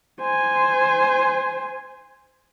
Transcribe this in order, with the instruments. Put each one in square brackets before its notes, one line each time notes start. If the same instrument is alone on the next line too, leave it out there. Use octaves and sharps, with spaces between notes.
[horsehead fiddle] C5 G#5